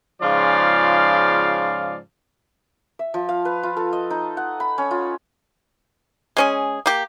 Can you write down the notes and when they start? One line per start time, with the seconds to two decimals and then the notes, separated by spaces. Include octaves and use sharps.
0.22 G#2 C#3 F3 F4 D5 F5
2.99 E5
3.14 F3
3.29 F5
3.45 B4
3.63 F4
3.77 A4
3.93 D#5
4.10 D#4
4.37 F#5
4.60 B5
4.78 C#4
4.91 F4
6.37 G#3 C#4 G#4
6.86 A#3 G4